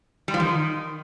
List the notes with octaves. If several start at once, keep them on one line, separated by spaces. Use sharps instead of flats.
G3
F3
D#3